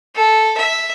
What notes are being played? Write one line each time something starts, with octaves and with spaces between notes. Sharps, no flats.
A4
E5